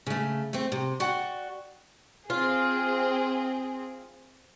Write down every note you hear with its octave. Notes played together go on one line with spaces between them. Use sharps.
C#3 A3
A3 C4
C3
F#4 D5 F#5 G5
C4 F4 G#4